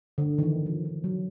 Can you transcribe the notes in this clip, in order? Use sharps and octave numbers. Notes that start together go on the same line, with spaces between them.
D3
D#3
E3
F3
F3
F#3